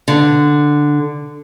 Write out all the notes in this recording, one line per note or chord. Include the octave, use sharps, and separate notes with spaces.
D3